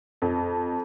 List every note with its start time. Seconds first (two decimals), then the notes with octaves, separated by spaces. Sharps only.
0.22 F2